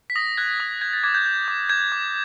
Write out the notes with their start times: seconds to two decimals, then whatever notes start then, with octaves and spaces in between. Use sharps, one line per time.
0.10 B6
0.16 D#6 A#6
0.37 F#6 G#6
0.60 D#6
0.81 G6 G#6
0.93 A6
1.04 D6 G#6
1.14 G6
1.26 G6
1.48 D6
1.69 G6 G#6
1.92 D6